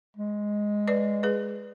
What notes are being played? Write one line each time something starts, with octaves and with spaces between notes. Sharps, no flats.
G#3
B4 D5
G#4 B4